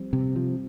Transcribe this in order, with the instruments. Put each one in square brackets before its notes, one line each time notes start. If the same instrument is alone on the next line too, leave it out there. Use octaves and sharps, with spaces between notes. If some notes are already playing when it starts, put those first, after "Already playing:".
Already playing: [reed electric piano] F3 G3 C4
[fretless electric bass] C3
F3